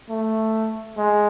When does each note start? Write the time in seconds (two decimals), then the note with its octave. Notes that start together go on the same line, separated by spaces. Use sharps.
0.09 A3
0.97 G#3